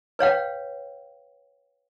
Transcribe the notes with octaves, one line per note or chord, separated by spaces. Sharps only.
B4 C#5 F5 G5